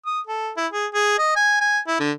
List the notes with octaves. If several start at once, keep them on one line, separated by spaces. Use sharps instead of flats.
D#6
A4
E4
G#4
G#4
D#5
G#5
G#5
E4
D3